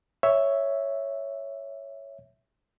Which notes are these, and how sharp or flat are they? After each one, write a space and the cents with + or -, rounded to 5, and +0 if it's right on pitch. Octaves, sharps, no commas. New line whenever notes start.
C#5 +0 E5 +0